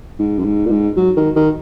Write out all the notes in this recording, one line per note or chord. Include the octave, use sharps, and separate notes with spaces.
G#2
F#2
G#2
A#2
G#2
F#3
D#3
D#3